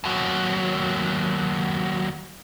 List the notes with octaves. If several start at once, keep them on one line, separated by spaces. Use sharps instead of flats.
D#2 F#3